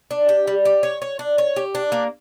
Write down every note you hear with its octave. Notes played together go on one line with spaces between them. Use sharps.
D4
G4
G3
G4
C#5
C#5
D4
C#5
G4
D4
A#3